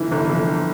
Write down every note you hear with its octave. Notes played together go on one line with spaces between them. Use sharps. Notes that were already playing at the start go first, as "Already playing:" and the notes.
Already playing: G1 E3
G1
F2